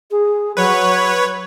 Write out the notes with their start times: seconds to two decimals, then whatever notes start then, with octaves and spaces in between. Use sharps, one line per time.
0.11 G#4
0.57 F#3 B4 C#5